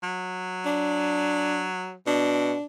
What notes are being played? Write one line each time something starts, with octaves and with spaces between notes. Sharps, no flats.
F#3
D4
B2 D4